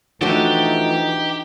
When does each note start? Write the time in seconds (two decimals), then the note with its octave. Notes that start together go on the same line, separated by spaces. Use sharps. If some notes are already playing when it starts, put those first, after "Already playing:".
0.21 E3 F3 A3 D4 D#4 F#4 G4 A4